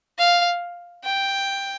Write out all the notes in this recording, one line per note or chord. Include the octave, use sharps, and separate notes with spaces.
F5
G5